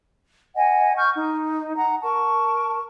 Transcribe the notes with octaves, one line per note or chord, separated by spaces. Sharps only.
D#5 F#5 G#5
C#6 F6 G6
D#4
F#5 A#5
A#4 A5 C#6